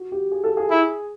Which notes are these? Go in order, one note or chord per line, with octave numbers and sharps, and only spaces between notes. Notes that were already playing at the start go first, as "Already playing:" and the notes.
Already playing: F#4
G4
G#4
A4
G#4
E4